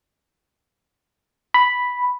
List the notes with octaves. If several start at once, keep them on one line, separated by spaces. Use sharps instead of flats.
B5